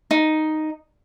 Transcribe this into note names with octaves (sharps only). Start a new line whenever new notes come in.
D#4